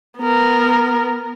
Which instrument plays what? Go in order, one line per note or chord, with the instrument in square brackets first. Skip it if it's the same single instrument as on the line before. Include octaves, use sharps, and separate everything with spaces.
[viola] B3 A#4